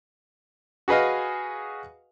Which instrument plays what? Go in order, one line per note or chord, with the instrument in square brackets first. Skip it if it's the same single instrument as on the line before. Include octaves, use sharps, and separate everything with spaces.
[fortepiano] F#4 G#4 B4 D#5 F5